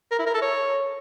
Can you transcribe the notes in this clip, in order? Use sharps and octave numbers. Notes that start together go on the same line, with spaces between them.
A#4
E4
A#4
A4
C#5